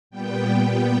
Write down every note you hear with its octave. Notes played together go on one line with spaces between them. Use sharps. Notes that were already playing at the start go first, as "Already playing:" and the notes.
A#2 G3 B3 G5